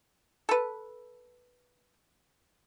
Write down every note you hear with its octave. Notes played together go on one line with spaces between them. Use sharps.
A4 B4